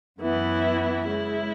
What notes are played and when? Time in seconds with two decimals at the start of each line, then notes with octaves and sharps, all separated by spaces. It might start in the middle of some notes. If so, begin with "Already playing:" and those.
0.20 F#2 E3 B3 E4
1.07 C#3 G#3 E4